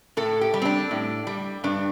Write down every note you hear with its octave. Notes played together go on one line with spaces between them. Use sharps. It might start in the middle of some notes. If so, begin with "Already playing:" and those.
A2 A4
G4
G3
C4
D4
A2
G3
G2 D4